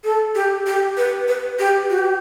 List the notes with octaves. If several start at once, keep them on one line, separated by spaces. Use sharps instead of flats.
A4
G4
G4
B4
B4
G4
F#4
G4